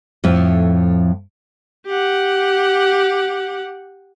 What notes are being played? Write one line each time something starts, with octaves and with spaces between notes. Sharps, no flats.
F2 A2 F3 E5
G4 F#5